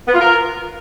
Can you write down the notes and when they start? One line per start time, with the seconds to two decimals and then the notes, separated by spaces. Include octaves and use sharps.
0.08 B3
0.14 F4
0.20 A#4